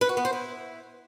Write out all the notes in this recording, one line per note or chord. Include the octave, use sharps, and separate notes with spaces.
B4
F#4
B3
C5
E4